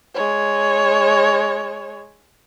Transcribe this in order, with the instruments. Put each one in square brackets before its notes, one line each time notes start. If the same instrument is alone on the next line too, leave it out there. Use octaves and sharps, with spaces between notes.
[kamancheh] G#3 C#5